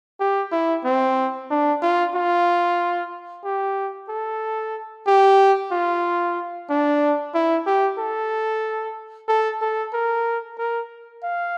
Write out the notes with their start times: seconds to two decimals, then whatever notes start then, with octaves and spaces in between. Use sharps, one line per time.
0.20 G4
0.52 E4
0.84 C4
1.50 D4
1.82 F4
2.15 F4
3.44 G4
4.09 A4
5.07 G4
5.72 F4
6.70 D4
7.34 E4
7.66 G4
7.98 A4
9.28 A4
9.62 A4
9.93 A#4
10.58 A#4
11.23 F5